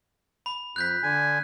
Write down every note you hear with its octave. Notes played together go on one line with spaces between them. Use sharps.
B5
F2 F#6 G6 B6
D3 G#5